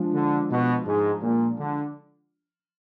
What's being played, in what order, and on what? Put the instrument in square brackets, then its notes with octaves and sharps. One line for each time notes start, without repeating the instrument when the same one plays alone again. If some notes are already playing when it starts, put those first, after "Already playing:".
Already playing: [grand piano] F3 G#3 D4 F4
[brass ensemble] D3
B2
G#2
A#2
D3